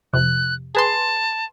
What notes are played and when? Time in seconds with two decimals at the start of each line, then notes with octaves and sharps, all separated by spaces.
0.13 F2 C3 F#6
0.75 G#4 B4 A5 C6